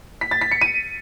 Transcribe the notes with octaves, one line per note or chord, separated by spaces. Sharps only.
B6
A6
B6
C#7
D#7